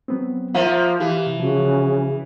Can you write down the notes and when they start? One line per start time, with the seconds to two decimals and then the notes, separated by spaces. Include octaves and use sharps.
0.08 F#3 B3 C4
0.54 F3 A#3 F4 E5
1.00 E3 E4 G4 F5
1.26 C3
1.40 C#3 F3 F#4